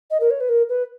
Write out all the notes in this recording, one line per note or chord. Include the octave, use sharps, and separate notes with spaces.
D#5
A#4
C#5
B4
A#4
B4